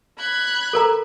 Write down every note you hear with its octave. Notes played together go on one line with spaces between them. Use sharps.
B5 F#6 G#6
A4 A#4 A#5